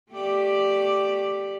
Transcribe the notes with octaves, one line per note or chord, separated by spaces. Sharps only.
A3 G4 D5